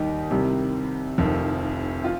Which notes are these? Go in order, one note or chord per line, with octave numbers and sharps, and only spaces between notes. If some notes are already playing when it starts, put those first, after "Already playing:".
Already playing: D#2 D#3 G3 D#4 G4
C2 C3 D#3 G3
F1 F2 D#3
F4